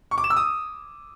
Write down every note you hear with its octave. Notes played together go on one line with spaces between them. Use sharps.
C#6
D6
E7
E6
D#6